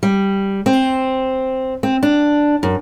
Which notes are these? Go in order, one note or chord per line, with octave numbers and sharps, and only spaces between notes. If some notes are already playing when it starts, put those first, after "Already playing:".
G3
C4
C4
D4
F#2